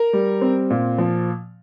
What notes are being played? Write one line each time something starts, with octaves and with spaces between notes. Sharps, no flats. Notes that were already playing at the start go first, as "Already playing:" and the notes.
Already playing: A#4
G3
C4
A#2
F3